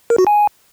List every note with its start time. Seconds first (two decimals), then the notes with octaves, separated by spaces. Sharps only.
0.10 A#4
0.18 F#4
0.27 G#5